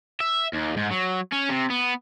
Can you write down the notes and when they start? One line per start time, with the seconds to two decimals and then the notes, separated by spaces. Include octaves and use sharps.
0.20 E5
0.53 D#2
0.77 G#2
0.91 F#3
1.33 C#4
1.50 C3
1.70 B3